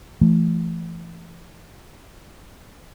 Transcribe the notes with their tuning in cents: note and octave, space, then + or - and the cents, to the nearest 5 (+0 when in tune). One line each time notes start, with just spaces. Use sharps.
E3 +40 A3 +0